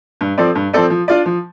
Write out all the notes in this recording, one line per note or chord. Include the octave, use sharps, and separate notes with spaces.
G2
F3 C4 A4 D5
G2
F3 C4 A4 D5
F3
D4 F4 D5
F3